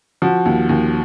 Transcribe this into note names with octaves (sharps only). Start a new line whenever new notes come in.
F3 F#4
D#2
D#2